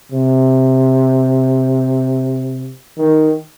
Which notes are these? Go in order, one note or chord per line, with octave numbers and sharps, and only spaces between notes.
C3
D#3